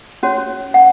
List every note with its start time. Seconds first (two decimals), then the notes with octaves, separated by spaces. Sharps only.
0.23 C#4 F#4 C#5
0.74 F#5